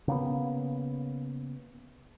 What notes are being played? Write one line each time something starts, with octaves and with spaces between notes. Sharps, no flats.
C#3 A#3 B3